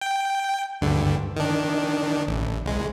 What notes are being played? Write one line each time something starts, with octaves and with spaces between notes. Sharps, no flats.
G5
D2 G2 D3
D#3 D4
A1
C2 G#3